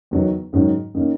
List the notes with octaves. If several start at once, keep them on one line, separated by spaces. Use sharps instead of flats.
E2 D#3 F#3
G#2 D#3 F#3 C#4 F#4
D#3 A#3 C#4